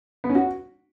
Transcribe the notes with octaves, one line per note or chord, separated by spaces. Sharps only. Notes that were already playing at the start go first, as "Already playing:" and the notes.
B3
C#4
F#4